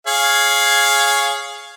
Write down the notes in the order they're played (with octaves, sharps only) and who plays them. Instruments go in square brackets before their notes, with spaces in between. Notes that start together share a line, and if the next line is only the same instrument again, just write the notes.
[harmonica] G#4 C#5 F5